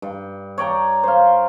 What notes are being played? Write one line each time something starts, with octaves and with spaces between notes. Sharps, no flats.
G2
C#5 D5 G5 A#5
C5 F5